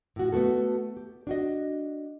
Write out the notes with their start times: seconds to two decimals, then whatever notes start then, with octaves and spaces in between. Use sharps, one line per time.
0.16 A2 F#4
0.32 A3 B3 F#4 A4
0.97 G4
1.27 D4 F#4 D#5